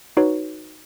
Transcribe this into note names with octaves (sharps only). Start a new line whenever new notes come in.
D#4 F#4 B4 C#5